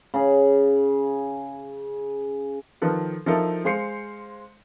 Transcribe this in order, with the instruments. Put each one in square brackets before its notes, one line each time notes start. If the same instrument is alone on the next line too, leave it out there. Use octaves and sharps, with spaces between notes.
[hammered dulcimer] C#3 G#4
[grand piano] D#3 F3 A4 B4
F3 D#4 E4 A4 A#4
G#3 C5 F5 C6 C7 C#7